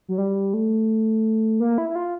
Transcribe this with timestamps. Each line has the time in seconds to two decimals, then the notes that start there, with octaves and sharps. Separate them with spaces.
0.08 F#3
0.18 G3
0.54 A3
1.60 A#3
1.78 E4
1.89 E4
1.96 F4